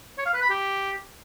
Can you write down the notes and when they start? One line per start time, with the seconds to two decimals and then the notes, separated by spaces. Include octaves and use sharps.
0.18 C#5
0.26 F5
0.34 B4
0.42 B5
0.50 G4